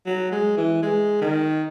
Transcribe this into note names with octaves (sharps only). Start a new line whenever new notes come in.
F#3
G#3
E3
G#3
D#3